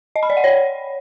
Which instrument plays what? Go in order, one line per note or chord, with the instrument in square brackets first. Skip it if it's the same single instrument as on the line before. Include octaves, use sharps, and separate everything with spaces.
[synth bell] D#5
B5
D5
F#5
C#5